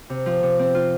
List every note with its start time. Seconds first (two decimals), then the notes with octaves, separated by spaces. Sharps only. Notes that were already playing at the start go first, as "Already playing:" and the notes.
0.10 C3
0.26 F3
0.43 C3
0.59 C4
0.75 F4